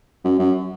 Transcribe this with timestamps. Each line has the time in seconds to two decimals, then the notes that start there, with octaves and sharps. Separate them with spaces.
0.25 F#2
0.39 F#2